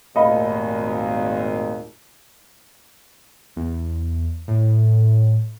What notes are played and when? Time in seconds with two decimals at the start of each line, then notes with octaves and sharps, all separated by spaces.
0.16 G#1 D#2 A#2 A3 D#5 F5 B5
3.56 E2
4.48 A2